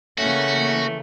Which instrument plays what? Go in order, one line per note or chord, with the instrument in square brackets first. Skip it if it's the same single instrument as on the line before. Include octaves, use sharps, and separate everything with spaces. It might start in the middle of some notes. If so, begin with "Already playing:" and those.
[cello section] C#3 E3 A#3 [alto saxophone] A3 [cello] C#4 [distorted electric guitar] F#4